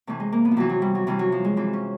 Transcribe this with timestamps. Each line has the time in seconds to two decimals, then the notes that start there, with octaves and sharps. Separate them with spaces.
0.07 C3 E3 A3
0.20 G#3
0.32 A#3
0.45 B3
0.51 F3
0.57 C3 E3 F#3
0.69 F#3
0.82 G3
0.95 F#3
1.07 C3 E3 G3
1.19 F#3
1.32 F3
1.45 G#3
1.56 C3 E3 C4
1.73 C#4